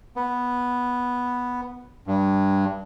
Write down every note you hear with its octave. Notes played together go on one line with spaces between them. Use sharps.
B3
G2